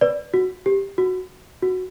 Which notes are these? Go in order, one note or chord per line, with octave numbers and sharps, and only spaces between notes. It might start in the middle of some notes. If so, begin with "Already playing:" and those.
B4 D5
F#4
G4
F#4
F#4